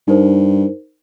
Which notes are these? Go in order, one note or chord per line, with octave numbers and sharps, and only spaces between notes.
G2 D#4 A#4 C5